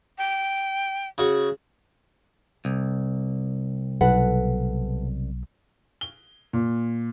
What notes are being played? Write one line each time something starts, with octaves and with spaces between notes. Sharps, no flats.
G5
C#3 F#4 C#6
C2
B1 A4 B4 F#5
G7
A#2